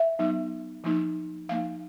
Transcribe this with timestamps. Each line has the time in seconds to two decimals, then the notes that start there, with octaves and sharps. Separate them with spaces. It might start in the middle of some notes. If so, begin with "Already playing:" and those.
Already playing: E5
0.19 F#3 B3 D#4
0.84 F3 A#3 D#4
1.49 F3 A#3 D#4 F5